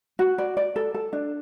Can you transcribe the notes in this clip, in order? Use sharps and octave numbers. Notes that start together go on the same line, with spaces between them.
F#4
D5
D5
A4
A4
D4